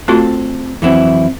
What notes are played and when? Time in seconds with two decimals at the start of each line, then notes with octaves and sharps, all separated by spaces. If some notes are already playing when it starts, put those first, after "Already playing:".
0.08 A3 C4 F4 F#4 A4
0.82 F2 E3 F#3 C4 E4